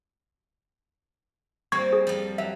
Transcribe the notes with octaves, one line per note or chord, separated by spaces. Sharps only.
G3 A#3 C4 C#6 G#6
G#4
F2 G3
F#3 E5